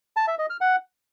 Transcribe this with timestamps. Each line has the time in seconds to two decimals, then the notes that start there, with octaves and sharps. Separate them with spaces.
0.17 A5
0.28 E5
0.39 D#5
0.50 F6
0.61 F#5